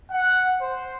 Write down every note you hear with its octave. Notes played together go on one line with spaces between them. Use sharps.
F#5
C5